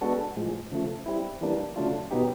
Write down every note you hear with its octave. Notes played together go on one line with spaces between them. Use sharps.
G#3 B3 D4 F#4 A4
A2 F3 G#3
C#3 F3 A3
G3 C4 E4
E3 G3 A#3 D4
C#3 F#3 A3 D4 F4
B2 F#3 B3 D#4 G4